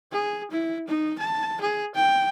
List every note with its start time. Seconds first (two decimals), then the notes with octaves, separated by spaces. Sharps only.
0.12 G#4
0.51 E4
0.88 D#4
1.19 A5
1.61 G#4
1.95 G5